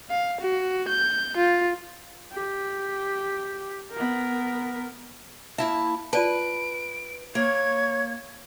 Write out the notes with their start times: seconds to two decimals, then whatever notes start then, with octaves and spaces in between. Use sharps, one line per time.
0.10 F5
0.41 F#4
0.88 G6
1.37 F4
2.33 G4
3.93 B3 A#4
5.58 A#3 E4 E5 A5
6.13 F4 B4 D5 A5 D7
7.35 A#3 C#5 G#6